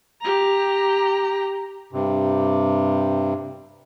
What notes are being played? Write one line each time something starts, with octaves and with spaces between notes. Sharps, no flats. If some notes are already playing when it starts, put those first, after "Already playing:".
G4 A#5
G2 C3